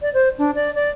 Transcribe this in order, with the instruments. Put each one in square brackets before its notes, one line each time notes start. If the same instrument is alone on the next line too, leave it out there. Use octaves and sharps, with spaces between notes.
[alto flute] D5
C5
D4
D5
D5